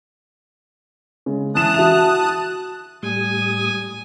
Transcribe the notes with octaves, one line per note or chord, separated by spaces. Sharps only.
C#3 G#3
E3 A5 D#6 F#6 E7
F#4 E5 F7
A2 G3 G#5 D#6